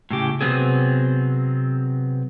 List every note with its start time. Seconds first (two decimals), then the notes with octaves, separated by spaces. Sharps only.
0.11 A2 C#3 G4
0.41 C3 F#3 B3 C4 G#4